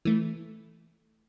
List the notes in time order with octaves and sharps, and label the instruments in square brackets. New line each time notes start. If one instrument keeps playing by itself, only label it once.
[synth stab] E3 A3